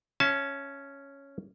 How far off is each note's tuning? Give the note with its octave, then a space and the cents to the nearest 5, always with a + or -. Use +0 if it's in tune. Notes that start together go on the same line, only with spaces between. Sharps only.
C#4 +0 E5 +20 A5 -35